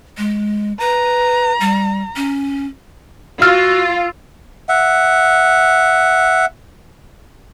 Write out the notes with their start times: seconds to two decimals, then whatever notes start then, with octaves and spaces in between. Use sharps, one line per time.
0.18 G#3
0.80 B4 A#5
1.60 G3
2.16 C#4
3.42 F4 F#4 E6 F6 A6
4.69 E5 F#5